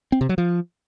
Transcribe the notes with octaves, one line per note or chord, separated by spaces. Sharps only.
C4
C3
F#3
F3